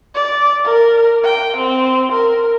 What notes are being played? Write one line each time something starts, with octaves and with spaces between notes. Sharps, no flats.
D5
A#4
G5
C4
A#4